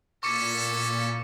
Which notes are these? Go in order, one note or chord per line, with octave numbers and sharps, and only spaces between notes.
A#2 C#4 E4 A4 C#6 D6 C#7